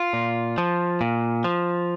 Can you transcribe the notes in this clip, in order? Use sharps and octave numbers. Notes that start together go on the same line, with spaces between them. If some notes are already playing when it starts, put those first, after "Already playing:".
Already playing: F4
A#2
F3
A#2
F3